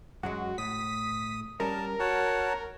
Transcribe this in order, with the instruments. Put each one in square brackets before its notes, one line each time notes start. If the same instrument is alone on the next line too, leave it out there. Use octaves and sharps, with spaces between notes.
[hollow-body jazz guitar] F#2 F#3 G#3 [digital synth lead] F#4
[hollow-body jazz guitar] A2 [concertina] D#6 [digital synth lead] B6
[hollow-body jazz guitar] G3 C#4 [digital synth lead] A#4 [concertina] A5
[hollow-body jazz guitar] F#4 [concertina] C#5 F#5 A5